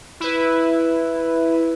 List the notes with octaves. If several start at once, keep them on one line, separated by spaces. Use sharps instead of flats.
E4 B4